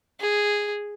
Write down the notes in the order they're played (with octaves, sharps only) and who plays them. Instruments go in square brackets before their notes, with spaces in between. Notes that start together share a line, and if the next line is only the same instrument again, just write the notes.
[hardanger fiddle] G#4